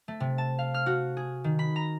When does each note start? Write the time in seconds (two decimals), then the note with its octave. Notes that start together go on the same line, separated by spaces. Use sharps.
0.08 A3
0.20 C3
0.38 A5
0.59 F5
0.74 F6
0.86 F#4
1.17 G#4
1.44 D#3
1.59 B5
1.76 A#5